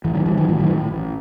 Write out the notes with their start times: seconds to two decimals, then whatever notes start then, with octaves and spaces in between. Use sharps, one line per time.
0.05 A1 E3
0.15 D#3 F#3
0.26 A1 E3 G3
0.37 D#3 F#3
0.49 A2 E3
0.59 D#3 F#3
0.70 A2
0.92 A1